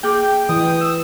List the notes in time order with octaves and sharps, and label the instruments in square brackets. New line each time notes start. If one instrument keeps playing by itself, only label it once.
[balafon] A#3 G#4 D6 [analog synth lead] G5
[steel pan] E3 [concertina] D#6
[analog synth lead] E6